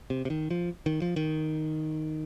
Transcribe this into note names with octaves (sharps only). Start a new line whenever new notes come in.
C3
C3
D#3
F3
D#3
F3
D#3